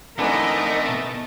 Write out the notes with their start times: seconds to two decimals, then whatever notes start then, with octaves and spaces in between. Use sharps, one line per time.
0.19 D3 E3 A3 C4 D4 D#4 A#4 D#5
0.88 B2 A5